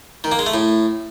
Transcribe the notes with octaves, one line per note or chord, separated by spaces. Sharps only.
D#3
A#3
G#3
A3
A2